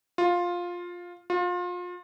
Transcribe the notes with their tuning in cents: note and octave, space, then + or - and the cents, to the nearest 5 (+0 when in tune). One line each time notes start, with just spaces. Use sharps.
F4 +10
F4 +30